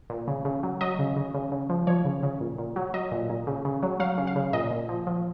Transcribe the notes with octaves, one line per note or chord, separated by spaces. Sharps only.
A#2
C#3
C#3
F#3
F#3 D#5
C#3
C#3
C#3
C#3
F3
F3 C#5
C#3
C#3
A#2
A#2
F#3
F#3 D#5
A#2
A#2
C#3
C#3
F#3
F#3 F5
C#3
F5
C#3
A#2 D#5
A#2
F3
F3